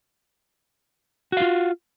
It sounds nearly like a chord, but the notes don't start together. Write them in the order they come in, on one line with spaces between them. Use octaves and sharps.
F#4 F5 F4